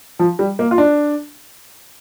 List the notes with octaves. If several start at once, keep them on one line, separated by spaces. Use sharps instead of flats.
F3
G3
A#3
F4
D4